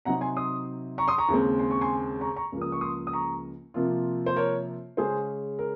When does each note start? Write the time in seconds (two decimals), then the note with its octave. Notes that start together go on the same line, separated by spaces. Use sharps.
0.05 C3 F#3 C4 D#4 F#5 A#5
0.21 G#5 C6
0.36 C6 D#6
0.98 A#5 C#6
1.08 C6 D#6
1.18 A#5 C#6
1.29 D#2 C#3 G#3 C4
1.59 C6
1.71 C#6
1.81 G#5 C6
2.21 A#5 C#6
2.36 A#5 C#6
2.52 C#2 C#3 F3 A#3
2.61 D#6
2.72 C#6
2.81 C6 D#6
3.07 D#6
3.13 A#5 C#6
3.74 C3 F3 A#3 F4
4.26 C5
4.36 A#4 C#5
4.97 C#3 G#3 C#4 G#4 C5
5.59 A#4